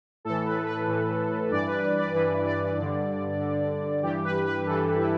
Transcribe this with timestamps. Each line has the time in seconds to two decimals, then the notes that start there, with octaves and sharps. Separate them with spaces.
0.25 A2 E3 A4
0.46 B4
0.66 B4
0.88 A2 E3
1.51 G2 E3 D5
1.67 B4
1.82 B4
1.98 D5
2.14 G2 E3 B4
2.45 D5
2.77 G2 D3
3.40 G2 D3
4.03 G2 E3 G4
4.24 B4
4.45 B4
4.66 G2 E3 A4
4.97 E4